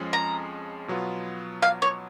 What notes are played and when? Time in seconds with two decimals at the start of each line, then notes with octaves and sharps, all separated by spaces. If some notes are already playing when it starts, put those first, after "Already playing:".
Already playing: F2 F3 G#3 C#4
0.13 A#5
0.88 B2 F#3 B3 F4
1.62 F5
1.82 C#5